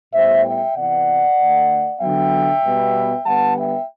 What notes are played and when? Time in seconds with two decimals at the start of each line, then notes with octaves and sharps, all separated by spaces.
0.13 A2 G3 B3 C5 E5
0.44 E5 G5
0.76 C3 E3 B3 D5 F#5
1.38 D3 A3
2.01 D3 F#3 B3 E5 G5
2.63 B2 G3 B3
3.26 D3 G3 B3 F#5 A5
3.57 E5 G5